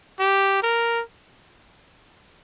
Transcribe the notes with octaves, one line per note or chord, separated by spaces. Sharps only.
G4
A#4